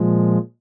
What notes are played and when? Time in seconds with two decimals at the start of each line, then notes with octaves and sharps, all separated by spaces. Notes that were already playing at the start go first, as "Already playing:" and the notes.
Already playing: A#2 F3 G#3